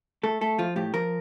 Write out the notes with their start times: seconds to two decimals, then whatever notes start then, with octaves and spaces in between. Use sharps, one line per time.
0.23 A3 A4
0.41 A3 A4
0.58 F3 F4
0.76 A2 G4
0.94 F3 A#4